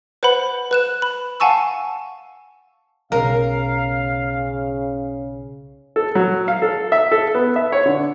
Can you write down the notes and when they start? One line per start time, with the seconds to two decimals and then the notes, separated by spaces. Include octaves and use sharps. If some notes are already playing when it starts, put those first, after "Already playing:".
0.23 B4 C5 F#5 B5
0.71 B4 F#6 E7
1.02 B5
1.40 F5 F#5 G#5 A5 C#6 E6
3.12 B1 C#3 A#4 F5
5.96 A4
6.15 F#3
6.48 F5
6.62 A4
6.92 E5
7.12 A4
7.35 B3
7.56 E5
7.72 C#5
7.86 D3